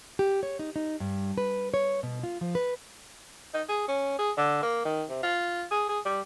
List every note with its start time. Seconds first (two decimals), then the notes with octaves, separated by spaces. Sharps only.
0.19 G4
0.43 C#5
0.59 D#4
0.76 D#4
1.00 G2
1.38 B4
1.74 C#5
2.03 B2
2.23 F4
2.41 F3
2.55 B4
3.54 D#4
3.69 G#4
3.88 C#4
4.19 G#4
4.37 D3
4.63 A#3
4.85 D#3
5.10 C3
5.23 F4
5.71 G#4
5.89 G#4
6.05 G3